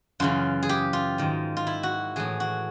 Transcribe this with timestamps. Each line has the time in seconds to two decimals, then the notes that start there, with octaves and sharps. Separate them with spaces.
0.20 F#2 C#3 E3 F4
0.63 G#4
0.69 G4
0.93 F4
1.18 G#2 D#3
1.57 F4
1.67 E4
1.83 F#4
2.16 A2 E3 G#4
2.40 F#4